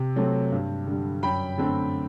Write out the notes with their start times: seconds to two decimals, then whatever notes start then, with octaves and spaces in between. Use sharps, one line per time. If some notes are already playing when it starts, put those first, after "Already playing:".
Already playing: C3
0.16 F#3 A3 C4
0.52 G2
0.86 D3 G3
1.23 F#2 G5 B5
1.58 D3 A3 C4